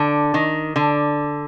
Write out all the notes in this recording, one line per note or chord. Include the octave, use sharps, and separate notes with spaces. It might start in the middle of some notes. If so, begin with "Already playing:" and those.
Already playing: D3
D#3
D3